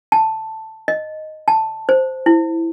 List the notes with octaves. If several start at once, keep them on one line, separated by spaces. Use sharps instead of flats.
A5
D#5
A5
C5
E4